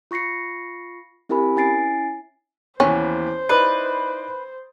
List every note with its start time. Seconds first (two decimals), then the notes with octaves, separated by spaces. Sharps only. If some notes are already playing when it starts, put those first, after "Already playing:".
0.11 F4 C#6 A#6 C7 C#7
1.29 C4 E4 G4 A#4 G#5 B5
1.56 C#4 E4 G#5 A6 C7 D7
2.80 D#2 E3 B3 C#4 C5
3.49 D#4 E4 B4 D5